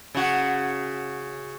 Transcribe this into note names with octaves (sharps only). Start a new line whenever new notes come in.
C#3 F#4